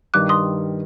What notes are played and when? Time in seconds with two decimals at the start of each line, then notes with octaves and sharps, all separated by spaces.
0.14 G2 D#3 G3 D6 F#6
0.29 C6 D#6